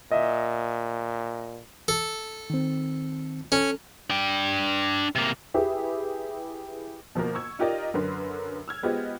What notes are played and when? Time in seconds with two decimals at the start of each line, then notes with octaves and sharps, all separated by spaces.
0.12 A#2 D#5 E5
1.88 A4
2.50 D#3 C4
3.52 C#4 A4
4.10 D4 G5
5.16 C3 A#3
5.54 E4 G4 G#4 B4 E5
7.15 B2 F3 A#3 A#4
7.35 C#6 E6 G#6
7.59 D#4 F4 G4 A#4 D5 D#5
7.94 F#2 D3 A#4 B4 C6
8.68 E6 F6 G#6
8.83 G#3 B3 F4 G4 C5 D#5